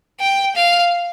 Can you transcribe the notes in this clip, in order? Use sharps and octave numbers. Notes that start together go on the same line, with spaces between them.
G5
F5